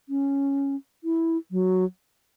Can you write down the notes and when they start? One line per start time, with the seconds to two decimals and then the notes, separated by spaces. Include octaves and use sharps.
0.09 C#4
1.04 E4
1.51 F#3